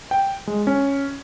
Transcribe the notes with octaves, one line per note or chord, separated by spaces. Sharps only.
G5
G#3
C#4